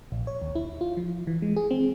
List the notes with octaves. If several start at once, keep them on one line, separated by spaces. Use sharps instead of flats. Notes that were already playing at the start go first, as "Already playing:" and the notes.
A#1
C#5
D#2
E4
F4
F3
E3
G#3
G#4
C4